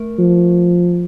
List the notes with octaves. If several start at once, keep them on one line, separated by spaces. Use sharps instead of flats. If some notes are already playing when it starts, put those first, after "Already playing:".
Already playing: A3 A#4
F3